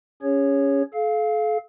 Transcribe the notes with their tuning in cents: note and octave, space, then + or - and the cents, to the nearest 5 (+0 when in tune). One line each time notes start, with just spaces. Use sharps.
C#4 +10 G#4 -30 C#5 +0
A4 -40 F5 +0